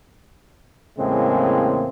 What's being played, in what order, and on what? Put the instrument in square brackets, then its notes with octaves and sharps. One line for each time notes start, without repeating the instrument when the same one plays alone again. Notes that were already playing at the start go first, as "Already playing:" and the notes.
[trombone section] E2 A2 C#3 G#3 A#3 C4